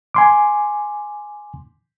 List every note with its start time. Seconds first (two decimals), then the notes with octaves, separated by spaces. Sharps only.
0.14 G#5 C6 D6